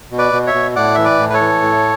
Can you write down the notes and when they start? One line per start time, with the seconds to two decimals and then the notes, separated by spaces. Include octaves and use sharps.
0.11 B2
0.18 B4 D5
0.33 B2
0.47 C#5 E5
0.54 B2
0.76 A2 D5 F#5
0.95 E3 E5
1.05 B4 D5
1.19 A2
1.30 B4
1.34 A4 C#5
1.41 E3
1.62 A2